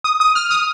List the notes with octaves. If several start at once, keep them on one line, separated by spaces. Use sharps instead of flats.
D#6
D#6
F6
D#6